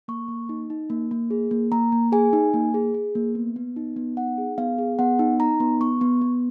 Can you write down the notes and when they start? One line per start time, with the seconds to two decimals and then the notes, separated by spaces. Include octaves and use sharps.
0.08 A#3 C#6
0.28 A#3
0.49 D#4
0.70 D#4
0.90 A#3
1.11 A#3
1.30 G#4
1.51 A#3
1.72 A#3 A#5
1.92 A#3
2.12 G#4 G#5
2.33 D#4
2.54 A#3
2.74 G#4
2.94 G#4
3.15 A#3
3.35 B3
3.56 B3
3.76 D#4
3.96 B3
4.17 D#4 F#5
4.38 G#4
4.58 B3 F5
4.78 G#4
4.99 B3 F#5
5.19 D#4
5.40 D#4 A#5
5.60 B3
5.81 B3 C#6
6.01 B3
6.22 B3